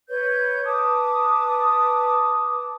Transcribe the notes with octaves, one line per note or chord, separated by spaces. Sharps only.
B4 C#5 G6
B4 A5 D6 D#6